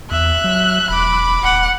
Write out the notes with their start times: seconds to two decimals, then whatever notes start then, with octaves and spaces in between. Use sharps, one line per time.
0.11 E2 E5 F#6
0.44 F#3
0.90 E1 B5 D6
1.43 D#1 F#5